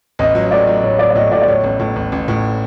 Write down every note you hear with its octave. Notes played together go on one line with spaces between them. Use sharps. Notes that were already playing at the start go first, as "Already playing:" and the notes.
A1 D#5
F#3
A2 D5
F#3
A2 C#5
F#3 D5
D5
A2 D#5
A2 D5
D5
A2 C#5
A1
A2
A1
A1
A2